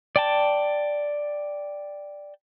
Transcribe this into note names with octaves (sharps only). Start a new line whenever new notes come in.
D5 G5 A5